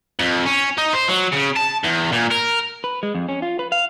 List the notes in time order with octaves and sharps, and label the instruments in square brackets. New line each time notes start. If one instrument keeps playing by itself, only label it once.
[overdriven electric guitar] F2
C#4
D#4
C5
F#3
C#3
A5
E2
A#2
A#4
[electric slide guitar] B4
G#3
F2
C#4
F4
B4
F5